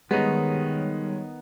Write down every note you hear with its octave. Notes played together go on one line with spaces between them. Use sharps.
D#3 G3 G#3 B3 D#4 C#5